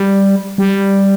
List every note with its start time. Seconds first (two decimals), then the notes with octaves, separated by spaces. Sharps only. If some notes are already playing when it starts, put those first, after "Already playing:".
Already playing: G3
0.58 G3